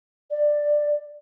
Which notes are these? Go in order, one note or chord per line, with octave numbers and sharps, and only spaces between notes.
D5